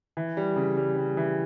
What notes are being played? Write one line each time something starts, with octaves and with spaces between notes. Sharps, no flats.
E3
G3
C#3
G3
G3
E3